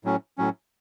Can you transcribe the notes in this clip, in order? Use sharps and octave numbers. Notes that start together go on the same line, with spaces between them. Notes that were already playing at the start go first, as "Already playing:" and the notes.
A2 F#3 C#4
A2 F#3 C#4